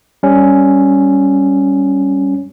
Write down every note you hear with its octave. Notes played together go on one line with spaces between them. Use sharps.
G3 C#4